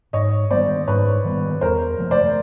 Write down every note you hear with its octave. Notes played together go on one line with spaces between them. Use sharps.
G#2 C#5 D#5
D#3 G3 B3 C5 D5
G#2 B4 C#5
D#3 G3 B3
E2 A#4 C5
C#3 F3 A3
C5 D5